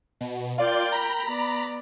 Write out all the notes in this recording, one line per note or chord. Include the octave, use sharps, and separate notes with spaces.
B2
F4 A#4 D5 G5
A#5 B5
B3 D5